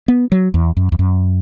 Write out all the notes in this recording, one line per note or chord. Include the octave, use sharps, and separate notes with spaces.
B3
F#3
E2
F#2
E2
F#2